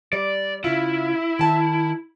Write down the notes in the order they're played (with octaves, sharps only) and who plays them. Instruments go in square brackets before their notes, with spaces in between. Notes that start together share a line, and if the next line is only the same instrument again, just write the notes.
[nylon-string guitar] G3 [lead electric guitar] D5
[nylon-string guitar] C#3 F4 [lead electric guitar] E4
[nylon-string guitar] D#3 A5